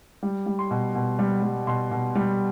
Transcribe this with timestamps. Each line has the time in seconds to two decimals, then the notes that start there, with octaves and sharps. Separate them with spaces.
0.23 G3
0.46 G3
0.59 C6
0.71 B2
0.95 B2
1.19 G3
1.43 G3
1.67 B2 C6
1.91 B2
2.15 G3